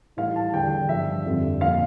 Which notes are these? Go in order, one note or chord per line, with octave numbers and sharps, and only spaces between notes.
A2 E3 G3 F5
A5
E2 D3 G3 G5
G2 F3 E5
F2 D3 G3
A#2 F3 F5